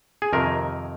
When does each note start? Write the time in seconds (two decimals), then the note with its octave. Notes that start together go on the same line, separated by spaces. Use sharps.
0.22 G#4
0.33 F2 C3 D#3 A#4